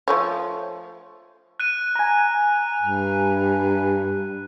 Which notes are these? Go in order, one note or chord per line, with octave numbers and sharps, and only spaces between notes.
F3 A3 C#5
F#6 D#7
G#5 A#5
G2